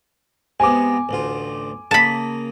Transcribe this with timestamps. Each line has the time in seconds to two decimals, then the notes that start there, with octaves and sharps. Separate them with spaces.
0.60 C3 G#3 B3 G#5 D6
1.09 A1 D2 F4
1.91 C#3 A#3 A5 B5